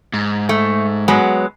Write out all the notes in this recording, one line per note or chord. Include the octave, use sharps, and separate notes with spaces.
G#2
A3
F#3 G#3 B3